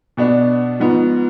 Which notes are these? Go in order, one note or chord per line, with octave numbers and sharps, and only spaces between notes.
B2 B3 D4
G#2 F3 B3